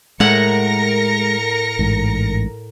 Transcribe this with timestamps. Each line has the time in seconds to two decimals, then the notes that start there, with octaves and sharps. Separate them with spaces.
0.20 A2 G#3 A#4 F#5 A#6 C#7
1.79 A1 G#2